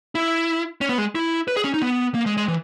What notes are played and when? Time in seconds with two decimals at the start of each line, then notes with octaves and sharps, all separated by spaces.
0.15 E4
0.81 C#4
0.89 B3
0.98 G#3
1.15 E4
1.48 B4
1.57 G#4
1.64 C#4
1.74 D#4
1.82 B3
2.14 A#3
2.26 G#3
2.37 G#3
2.48 E3